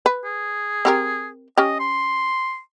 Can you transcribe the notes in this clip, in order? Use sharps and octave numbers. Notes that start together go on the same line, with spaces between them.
B4
G#4
C4 G4 A#4
C#4 G4 D#5
C6